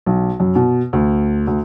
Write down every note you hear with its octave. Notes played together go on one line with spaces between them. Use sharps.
B1
F#2
B2
D2
D2